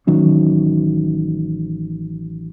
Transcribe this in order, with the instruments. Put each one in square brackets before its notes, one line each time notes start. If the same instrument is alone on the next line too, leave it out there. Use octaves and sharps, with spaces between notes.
[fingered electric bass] A1 D#3 F#3 C#4